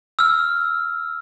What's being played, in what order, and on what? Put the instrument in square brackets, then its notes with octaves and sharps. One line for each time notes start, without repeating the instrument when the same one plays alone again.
[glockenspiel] E6 F6